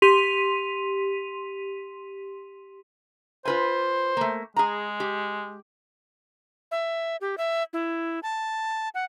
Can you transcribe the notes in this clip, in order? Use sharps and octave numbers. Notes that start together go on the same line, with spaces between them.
G4 C6 B6 D#7 F7
F4 B4 C5 G#5
A3 A#3
G#3 G#4 A#5
G4
E5
G4
E5
E4
A5
F#5